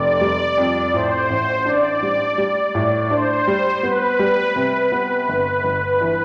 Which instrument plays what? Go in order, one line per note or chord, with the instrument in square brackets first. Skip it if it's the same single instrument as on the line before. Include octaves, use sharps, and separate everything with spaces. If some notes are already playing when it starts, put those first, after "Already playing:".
Already playing: [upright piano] F1 [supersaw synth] D5
[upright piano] G3
F2
[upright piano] A2 [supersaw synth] C5
[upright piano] A1
[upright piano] D4 [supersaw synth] D5
[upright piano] G3
G3
A2
[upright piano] D4 [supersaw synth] C5
[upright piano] G3
[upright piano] B3 [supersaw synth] B4
[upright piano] G3
C3
B3
G1
G1
E3